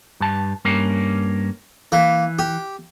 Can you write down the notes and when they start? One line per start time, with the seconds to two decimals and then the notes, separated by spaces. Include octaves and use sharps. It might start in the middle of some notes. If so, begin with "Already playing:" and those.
0.20 G2 A5
0.65 G2 A#3 C#4
1.92 E3 A#3
2.39 G4